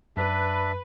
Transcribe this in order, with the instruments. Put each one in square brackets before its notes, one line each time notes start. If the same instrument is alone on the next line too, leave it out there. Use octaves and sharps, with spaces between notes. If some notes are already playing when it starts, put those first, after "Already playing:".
[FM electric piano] F#2 [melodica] D4 E5 [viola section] B4